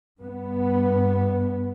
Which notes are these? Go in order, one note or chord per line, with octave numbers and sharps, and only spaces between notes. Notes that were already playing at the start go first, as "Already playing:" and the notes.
G2 B3